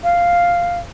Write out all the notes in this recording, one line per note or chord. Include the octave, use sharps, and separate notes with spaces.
F5